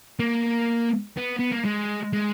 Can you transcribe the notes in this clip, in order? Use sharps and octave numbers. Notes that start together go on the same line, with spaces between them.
A#3
B3
B3
A#3
G#3
G#3